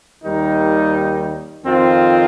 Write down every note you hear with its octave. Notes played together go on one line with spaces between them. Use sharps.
D#2 D#3 G3 D#4
F2 D#3 C4 F4